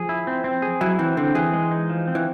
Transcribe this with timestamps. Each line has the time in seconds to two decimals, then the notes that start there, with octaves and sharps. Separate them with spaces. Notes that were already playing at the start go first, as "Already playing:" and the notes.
Already playing: F3 G#4
0.09 E4
0.27 C4
0.44 C4
0.62 G#4
0.81 F#3 E4
0.99 E3 C4
1.17 D3 C4
1.35 E3 G#4
1.54 G#3
1.71 D#4
1.90 F3
2.08 C4
2.15 E3